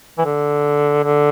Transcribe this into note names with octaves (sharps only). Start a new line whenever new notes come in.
E3
D3
D3